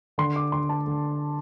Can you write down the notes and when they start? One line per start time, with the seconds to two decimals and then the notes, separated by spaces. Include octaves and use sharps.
0.18 D3 C6
0.36 D6
0.52 D3 C6
0.69 A5
0.87 D3